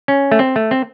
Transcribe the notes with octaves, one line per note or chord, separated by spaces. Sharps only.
C#4
A3
C4
A3
C4